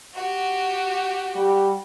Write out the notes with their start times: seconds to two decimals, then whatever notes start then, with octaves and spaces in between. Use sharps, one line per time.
0.14 F#4 G4
1.36 G3